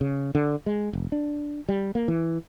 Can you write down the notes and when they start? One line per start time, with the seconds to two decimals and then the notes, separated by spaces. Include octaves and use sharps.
0.01 C#3
0.35 D3
0.66 G#3
0.93 F1
1.12 D4
1.69 G3
1.95 A#3
2.08 E3